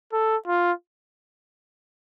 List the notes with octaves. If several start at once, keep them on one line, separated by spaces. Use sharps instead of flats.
A4
F4